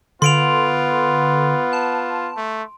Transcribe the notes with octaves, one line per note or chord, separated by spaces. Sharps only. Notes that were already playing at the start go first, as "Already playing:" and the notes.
D3 B3 F4 C6 D7 F7
A5
A3